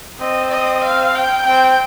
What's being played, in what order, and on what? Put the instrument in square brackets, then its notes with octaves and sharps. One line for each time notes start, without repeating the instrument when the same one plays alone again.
[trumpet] C4 [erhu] D#5
[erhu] D#5
F5
G5
[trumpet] C4 [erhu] G5